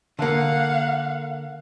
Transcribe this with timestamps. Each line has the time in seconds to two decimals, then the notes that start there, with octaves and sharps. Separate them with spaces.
0.19 D3 A#3 F5 F#5